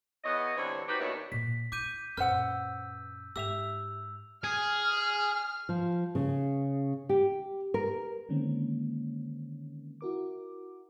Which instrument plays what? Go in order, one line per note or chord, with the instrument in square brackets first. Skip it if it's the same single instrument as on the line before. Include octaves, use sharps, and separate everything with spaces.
[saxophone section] E2 B3 C#5 D#5
D3 E3 G3 C4 C#5
D#4 F#4 G4 B4 C5
D#2 B2 D#3 D4 E4 C#5
[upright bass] A#2 [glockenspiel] B6
[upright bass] E4 [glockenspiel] D6 G6 D#7
[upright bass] F#2 A#2 [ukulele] B4 C5 F#5 [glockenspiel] E6 F6
[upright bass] G#2 [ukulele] G4 E5 [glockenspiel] E6 F7
[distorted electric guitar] G#4 [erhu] F6
[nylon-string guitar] F3
C#3
G4
A#4
[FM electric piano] D3 D#3 G#3 A#3 C4 C#4
E4 F#4 A#4 D6